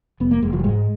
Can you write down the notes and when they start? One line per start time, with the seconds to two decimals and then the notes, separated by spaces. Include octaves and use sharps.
0.20 F1 B3
0.31 A#3
0.43 F1 G#3
0.53 F3
0.59 F#3
0.64 G#2 G#3